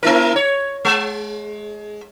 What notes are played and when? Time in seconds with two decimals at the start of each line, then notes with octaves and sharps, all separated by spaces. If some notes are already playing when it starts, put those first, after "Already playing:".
0.03 A#3 E4 A#4
0.36 C#5
0.85 G#3